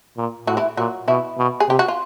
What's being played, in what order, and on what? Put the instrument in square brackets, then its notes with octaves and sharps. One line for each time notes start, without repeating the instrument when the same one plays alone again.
[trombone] A#2
[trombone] A2 [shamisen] F#3 F#4
[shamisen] E3 E4
[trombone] A#2 [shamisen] F#3 F#4
[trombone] B2 [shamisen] E3 E4
[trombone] B2
[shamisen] G#4
[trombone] C3 [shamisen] G4
[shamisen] F#4
F4